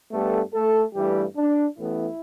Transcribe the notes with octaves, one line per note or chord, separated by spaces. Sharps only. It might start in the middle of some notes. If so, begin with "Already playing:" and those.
G2 G3 A3 B3 A4
A3 A4
G2 E3 G3 A3 G4
D4
A1 A2 E3 B3 E4